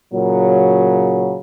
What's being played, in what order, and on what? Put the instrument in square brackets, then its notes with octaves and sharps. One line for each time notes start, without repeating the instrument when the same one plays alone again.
[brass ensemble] A#2 C#3 F#3